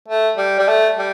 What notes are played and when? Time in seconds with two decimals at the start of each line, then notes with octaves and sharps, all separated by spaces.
0.08 A3
0.37 G3
0.59 G3
0.68 A3
0.97 G3